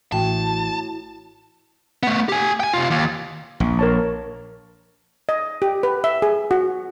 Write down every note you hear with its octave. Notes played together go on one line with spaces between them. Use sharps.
A1 A2 F#4 G5 A5
A3 B3
G4 G#5
G5 G#5
C3 F4
D#2
A#1
A#4 C#5 A5
D#5
G4
B4
E5
G#4
F#4